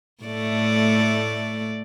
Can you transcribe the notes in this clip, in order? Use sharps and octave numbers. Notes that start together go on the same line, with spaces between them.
A2 A3 D5